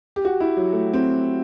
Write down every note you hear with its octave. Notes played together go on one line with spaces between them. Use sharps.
G4
F#4
E4
F#3
A3
C4